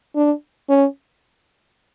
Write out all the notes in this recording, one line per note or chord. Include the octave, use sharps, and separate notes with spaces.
D4
C#4